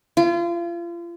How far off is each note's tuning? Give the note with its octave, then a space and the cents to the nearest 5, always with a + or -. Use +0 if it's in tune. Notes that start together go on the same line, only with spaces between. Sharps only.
F4 -35